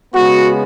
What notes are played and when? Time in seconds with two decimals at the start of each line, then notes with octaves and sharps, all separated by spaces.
0.13 C#3 G#3 B3 F#4